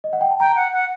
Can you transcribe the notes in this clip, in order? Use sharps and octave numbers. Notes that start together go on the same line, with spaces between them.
D#5
F#5
G5
A5
G5 A#5
F#5
F#5